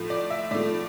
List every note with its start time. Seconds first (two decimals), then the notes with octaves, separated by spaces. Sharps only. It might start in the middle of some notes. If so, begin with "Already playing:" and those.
Already playing: A2 F3 A3
0.10 D5
0.30 E5
0.51 A2 F3 A3 D5